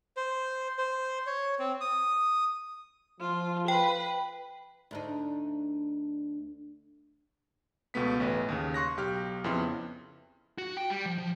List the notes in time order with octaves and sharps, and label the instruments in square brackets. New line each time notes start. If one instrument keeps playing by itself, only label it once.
[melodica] C5
C5
C#5
C4
D#6
[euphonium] F3 [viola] F4
[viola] B4 [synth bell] G5
[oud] D2 D4 D#4
[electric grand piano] C#2 B2 A3 B3 B6
A1 A3 B4
D#2 C#3
C6 C#6 F#6 A#6
B1 G4 F6
F2 C#3 B3 E4 C6
[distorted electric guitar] F#4
G5
G3
F3
F3